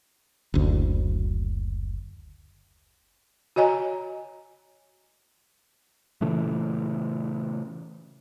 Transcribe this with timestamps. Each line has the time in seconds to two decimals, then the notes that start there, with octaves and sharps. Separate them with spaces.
0.54 F#1 D2
3.56 F#4 C#5 D#5 G#5 A#5
6.21 A#2 C#3 E3 A3